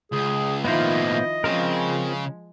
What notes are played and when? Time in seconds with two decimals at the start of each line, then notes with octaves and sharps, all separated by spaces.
0.12 C#2 G#4
0.65 A2 D#3 F3 A#3 B3 E4 C5 D#5
1.44 C#3 F3 G#3 C4 F4 A#4